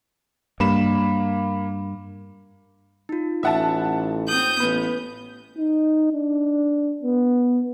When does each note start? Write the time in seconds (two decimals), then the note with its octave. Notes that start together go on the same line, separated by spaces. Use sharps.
0.60 G2 A#3 B5 E7
3.09 D#4 F4
3.43 A1 E5 F#5 A5
4.28 C4 D#6 G6 F#7
4.60 A1 B3 B4 B5
5.58 D#4
6.12 D4
7.03 B3